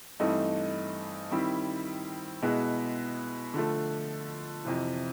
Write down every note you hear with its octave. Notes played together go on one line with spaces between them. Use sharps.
G2 E3 A3 C4 D#4
D#3 G3 C4 E4
B2 G#3 B3 E4
D3 F3 A3
F2 C3 E3